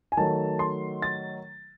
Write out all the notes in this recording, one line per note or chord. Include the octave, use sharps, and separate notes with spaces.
G#5
D#3 F#3 A3 A5
C6
A6